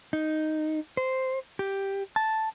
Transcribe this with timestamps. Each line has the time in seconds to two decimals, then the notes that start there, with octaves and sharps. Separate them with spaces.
0.13 D#4
0.97 C5
1.59 G4
2.16 A5